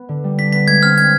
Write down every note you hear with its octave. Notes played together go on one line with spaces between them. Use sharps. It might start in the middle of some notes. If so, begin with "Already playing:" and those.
Already playing: B3
D3
G3
D4 B6
B3 B6
G#3 G#6
C4 F6
C4 G#6